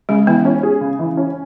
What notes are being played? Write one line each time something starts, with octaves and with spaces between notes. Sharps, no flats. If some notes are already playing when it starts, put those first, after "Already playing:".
C#3 G#3
E3 B3
C#4
G#4
C#3
E3
C#4